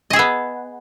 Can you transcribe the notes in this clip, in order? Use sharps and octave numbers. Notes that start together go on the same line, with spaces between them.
B3 G#4 D#5 E5